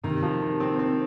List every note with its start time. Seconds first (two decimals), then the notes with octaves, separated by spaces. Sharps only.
0.04 C3 D#3
0.22 F3
0.42 C3
0.60 C4
0.79 C4